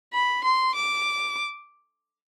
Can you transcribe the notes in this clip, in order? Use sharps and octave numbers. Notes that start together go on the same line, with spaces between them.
B5
C6
D6